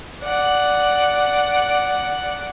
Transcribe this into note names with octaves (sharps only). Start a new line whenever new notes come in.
D5 F#5